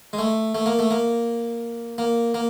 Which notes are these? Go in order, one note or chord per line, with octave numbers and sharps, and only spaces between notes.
G#3
A3
A3
A#3
A3
A#3
A#3
A#3